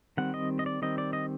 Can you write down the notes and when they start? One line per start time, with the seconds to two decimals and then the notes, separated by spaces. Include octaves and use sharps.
0.17 D#3 G3 C4 F#5
0.34 D#5
0.59 D#5
0.66 D5
0.82 D#3 G3 C4 D#5
0.98 D5
1.13 D#5